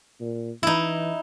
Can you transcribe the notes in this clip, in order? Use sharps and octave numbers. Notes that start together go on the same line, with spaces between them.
A#2
E3 D#4 E4